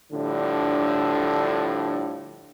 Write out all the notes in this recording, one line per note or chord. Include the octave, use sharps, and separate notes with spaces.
A2 D3 F3 G3 D4